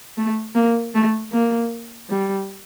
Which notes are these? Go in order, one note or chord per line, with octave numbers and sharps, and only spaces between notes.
A3
A#3
A3
A#3
G3